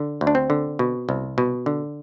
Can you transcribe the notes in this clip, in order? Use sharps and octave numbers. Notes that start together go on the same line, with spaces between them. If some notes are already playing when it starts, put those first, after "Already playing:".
Already playing: D3
D2
D4
C4
D3
B2
C2
B2
D3